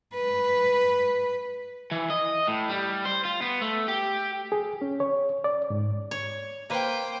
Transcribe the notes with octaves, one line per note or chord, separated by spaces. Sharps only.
B4
E3
D#5
A2
G3
C5
F4
B3
A3
G4
G#4
C#4
C#5
D5
G#2
C#5
A#3 B4 C5 G5